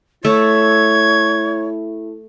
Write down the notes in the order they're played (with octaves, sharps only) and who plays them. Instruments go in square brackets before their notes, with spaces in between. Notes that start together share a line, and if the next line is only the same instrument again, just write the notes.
[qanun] A3 [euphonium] E4 [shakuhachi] C#5 [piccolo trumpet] G#6